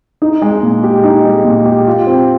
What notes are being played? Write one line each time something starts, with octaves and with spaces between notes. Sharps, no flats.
D#4
G#3
A#2
G4
D#4
G#3
A#2
G4
F4
C4